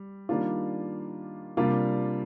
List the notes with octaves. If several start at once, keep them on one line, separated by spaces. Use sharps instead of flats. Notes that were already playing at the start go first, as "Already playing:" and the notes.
Already playing: G3
D#3 G3 A#3 D4 F4
C3 G3 A#3 D4 F4